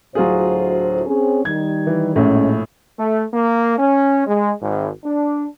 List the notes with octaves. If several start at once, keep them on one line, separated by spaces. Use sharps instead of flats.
D2 A2 F#3 F4 G#4 C5
C4 C#4 G#4
D#3 G3 G#6
E3
A#1 A2 G#3 C#4
A3
A#3
C#4
G#3
G#1
D4